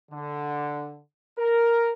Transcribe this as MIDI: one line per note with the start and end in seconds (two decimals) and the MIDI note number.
0.11 0.99 50
1.38 1.92 70